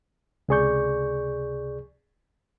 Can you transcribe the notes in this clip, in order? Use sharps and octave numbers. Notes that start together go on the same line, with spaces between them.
C#2 C3 G#4 D5 C#6 G6